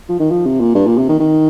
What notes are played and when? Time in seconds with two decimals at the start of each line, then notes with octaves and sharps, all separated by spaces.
0.09 F3
0.20 D#3
0.31 F3
0.46 C3
0.61 A#2
0.75 G2
0.86 A#2
0.98 C3
1.09 D#3
1.20 D#3